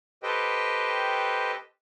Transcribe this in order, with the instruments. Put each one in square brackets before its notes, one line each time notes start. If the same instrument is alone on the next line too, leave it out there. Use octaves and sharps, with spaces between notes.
[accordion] G4 A4 B4 C5 D#5 G5